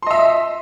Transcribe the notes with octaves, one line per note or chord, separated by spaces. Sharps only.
D#5 E5 C6